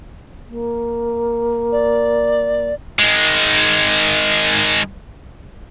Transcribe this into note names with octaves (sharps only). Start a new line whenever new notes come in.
A#3
D5
D#3 G#3